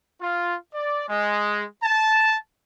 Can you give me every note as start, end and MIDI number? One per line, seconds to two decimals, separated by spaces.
0.21 0.55 65
0.73 1.07 74
1.08 1.63 56
1.82 2.36 81